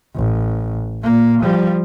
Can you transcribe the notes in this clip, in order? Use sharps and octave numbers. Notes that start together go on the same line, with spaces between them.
A1
A#2 A#3
F3 G3